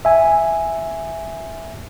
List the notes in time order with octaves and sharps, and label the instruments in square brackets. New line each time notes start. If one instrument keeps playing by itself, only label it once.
[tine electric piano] E5 G#5